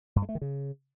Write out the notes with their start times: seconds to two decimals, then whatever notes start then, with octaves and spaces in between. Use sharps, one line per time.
0.16 G2
0.22 G#3
0.29 A3
0.35 D#3
0.42 C#3